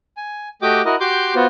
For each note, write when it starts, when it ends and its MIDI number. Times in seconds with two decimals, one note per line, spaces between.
0.17 0.49 80
0.62 0.82 57
0.62 0.82 66
0.62 0.82 67
0.62 0.82 75
0.62 0.82 79
0.62 0.82 86
0.85 0.96 64
0.85 0.96 66
0.85 0.96 70
0.85 0.96 75
1.00 1.34 66
1.00 1.34 67
1.00 1.34 84
1.00 1.34 86
1.00 1.34 91
1.35 1.47 59
1.35 1.47 65
1.35 1.47 66
1.35 1.47 72